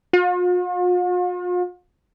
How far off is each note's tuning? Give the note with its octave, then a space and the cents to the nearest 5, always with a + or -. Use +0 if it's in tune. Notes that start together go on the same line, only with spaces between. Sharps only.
F4 +45